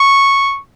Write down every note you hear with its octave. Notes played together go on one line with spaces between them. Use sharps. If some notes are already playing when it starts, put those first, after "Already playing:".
Already playing: C#6